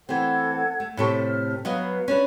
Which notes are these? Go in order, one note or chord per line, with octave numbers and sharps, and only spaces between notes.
E3 A3 C4 A4 F#5 G#6
A3
A2 C3 A4 C#6
F6
F#3 B3 B4 D#5 F5
C#4 D4 B4